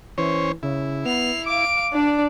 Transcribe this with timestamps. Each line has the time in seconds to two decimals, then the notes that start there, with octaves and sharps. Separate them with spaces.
0.18 E3 C#4 C5 C#5
0.63 C#3 E4
1.05 B3 C7 F7
1.46 F5 D6 D7
1.93 D4 D5